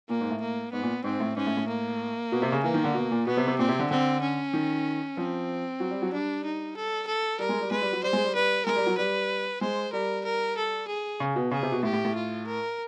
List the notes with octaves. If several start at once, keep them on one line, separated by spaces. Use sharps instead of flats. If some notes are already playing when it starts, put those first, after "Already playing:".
A#2 A#3
G#2
A2
A#3
G#2 B3
A#2
G#2 C4
A2
G#2 C#4
A2
A2
A#3
B2
C3
C#3
E3 A#3
D#3
D3
B2
A#2
B2 B3
C3
C3
A#2 C4
C3
D3
D3 C4
C#4
D#3
F3 C4
F#3
G3
F#3
G3 D4
D#4
A4
A4
G3 A#4
G#3
G3
G#3 B4
G3
F#3
G3 C5
G#3
G3
G3 B4
G#3 A#4
G3
F#3
G3 B4
G#3 C5
G3 A#4
A#4
A4
G#4
C#3
B2
C#3 G#4
C3
B2
A2 G4
A2
A2
F4
A#4